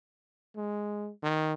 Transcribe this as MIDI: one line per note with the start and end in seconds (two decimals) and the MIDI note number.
0.56 1.10 56
1.23 1.53 51